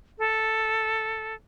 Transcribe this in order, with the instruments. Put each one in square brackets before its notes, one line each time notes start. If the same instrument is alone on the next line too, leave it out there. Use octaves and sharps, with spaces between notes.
[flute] A4